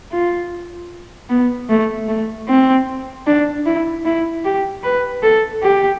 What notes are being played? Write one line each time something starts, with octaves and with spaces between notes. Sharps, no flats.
F4
B3
A3
A3
C4
D4
E4
E4
G4
B4
A4
G4